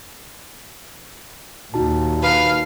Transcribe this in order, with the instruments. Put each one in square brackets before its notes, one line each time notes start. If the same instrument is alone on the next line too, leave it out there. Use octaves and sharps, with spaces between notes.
[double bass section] D#2 A#2 [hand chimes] D#4 F#4 A5
[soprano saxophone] B4 [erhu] F5